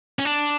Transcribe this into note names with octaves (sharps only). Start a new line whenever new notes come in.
C#4
D4